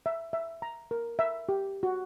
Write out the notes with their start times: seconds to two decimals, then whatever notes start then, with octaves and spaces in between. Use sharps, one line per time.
0.06 E5
0.33 E5
0.62 A#5
0.91 A#4
1.19 E5
1.49 G4
1.83 F#4